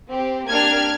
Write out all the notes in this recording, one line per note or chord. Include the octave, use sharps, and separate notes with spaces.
C4 G4
A#3 D4 G4 F6 G#6